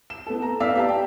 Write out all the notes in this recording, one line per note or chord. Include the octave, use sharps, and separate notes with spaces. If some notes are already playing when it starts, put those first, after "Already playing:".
E7
B3 A4
A#5
B3 D5 F5 E6 B6
G4 D5 A5
G5